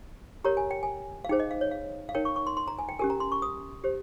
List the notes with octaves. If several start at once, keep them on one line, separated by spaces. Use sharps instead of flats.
G4 A#4 C#5 A#5
G#5
G5
G#5
F5
D#4 G#4 C5 G5
D#5
F5
C#5
F5
F5
D#4 A#4 C#5 G5
C#6
C#6
C6
C6
A#5
G#5
G5
C#4 G4 A#4 G#5
A#5
C6
C#6
D#6
G4 C5